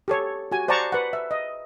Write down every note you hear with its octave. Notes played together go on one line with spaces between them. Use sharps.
G4 A4 C#5
F#4 G4 G#5
C5 D5 F#5 A5 A#5 C#6
B4 F#5
E5
D#5